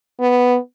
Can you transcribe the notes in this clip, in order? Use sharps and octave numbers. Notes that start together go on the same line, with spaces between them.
B3